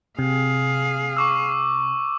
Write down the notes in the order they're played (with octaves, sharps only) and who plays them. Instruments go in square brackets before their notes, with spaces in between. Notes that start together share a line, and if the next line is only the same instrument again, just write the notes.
[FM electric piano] C3 [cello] G#4 F5
[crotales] C#6 D6 E6